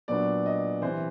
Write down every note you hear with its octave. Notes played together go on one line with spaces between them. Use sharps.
A#2 F#3 B3 D4 D5
D#5
C3 E3 C5